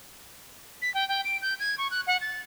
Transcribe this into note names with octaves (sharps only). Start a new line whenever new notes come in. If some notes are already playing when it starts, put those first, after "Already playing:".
B6
G5
G5
D7
G6
G#6
C#6
F#6
F#5
A6